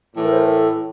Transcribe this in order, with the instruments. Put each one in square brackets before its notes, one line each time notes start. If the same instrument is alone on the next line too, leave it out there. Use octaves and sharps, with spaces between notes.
[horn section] A2 E3 A3
[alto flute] A#4
C5
A#4
A4